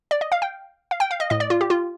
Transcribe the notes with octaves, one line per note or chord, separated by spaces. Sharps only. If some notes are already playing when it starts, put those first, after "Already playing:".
D5
D#5
F5
G5
F5
G5
F5
D#5
A2 D#5
D5
F4
G4
F4